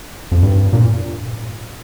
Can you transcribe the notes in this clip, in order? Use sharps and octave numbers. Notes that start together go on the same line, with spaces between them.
F2
G2
A#2